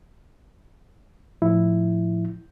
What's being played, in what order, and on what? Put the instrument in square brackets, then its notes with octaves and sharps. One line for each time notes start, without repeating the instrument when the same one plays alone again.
[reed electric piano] A2 F3 E4